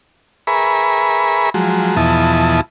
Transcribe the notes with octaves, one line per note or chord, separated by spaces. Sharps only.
G#4 A#4 B4 E5 B5 C#6
F3 F#3 G#3
E2 B2 F3 E4 A5 D#6